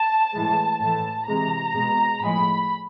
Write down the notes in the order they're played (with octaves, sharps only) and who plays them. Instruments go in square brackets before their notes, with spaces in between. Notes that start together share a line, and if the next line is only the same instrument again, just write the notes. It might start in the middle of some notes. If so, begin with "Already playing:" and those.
Already playing: [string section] A5
A2 E3 G#3
A2 E3 A3 A5
C3 E3 G#3 A#5
B2 G#3
A2 F3 G#3 B5